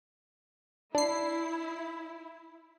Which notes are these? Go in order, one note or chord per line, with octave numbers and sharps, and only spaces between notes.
D4 E4 C7